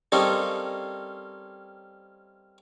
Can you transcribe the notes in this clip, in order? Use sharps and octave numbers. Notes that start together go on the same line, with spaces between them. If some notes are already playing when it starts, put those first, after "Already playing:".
G3 A#3 C4 C#4 D#4 A4